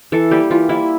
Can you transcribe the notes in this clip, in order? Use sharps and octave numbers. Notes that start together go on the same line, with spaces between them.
E3 A4
G3 A#3 G4
E3 F4
G3 A#3 E4